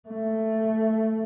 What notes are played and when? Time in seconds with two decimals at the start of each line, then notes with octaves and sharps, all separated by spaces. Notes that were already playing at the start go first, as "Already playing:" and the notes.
0.09 A3